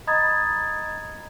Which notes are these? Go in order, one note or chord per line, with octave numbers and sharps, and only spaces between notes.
D#5 A#5 B5 D#6 G#6 A6